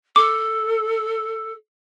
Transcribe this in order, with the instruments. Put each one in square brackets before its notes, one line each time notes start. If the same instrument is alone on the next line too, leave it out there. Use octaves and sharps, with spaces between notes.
[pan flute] A4 [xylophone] D6